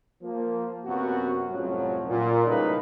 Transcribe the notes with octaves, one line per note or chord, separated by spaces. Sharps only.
F3 A#3
F#2 C3 B3 F#4
C2 F#2 A2 F3 F#3
A#2
A2 C#3 G3 A#3 D#4 B4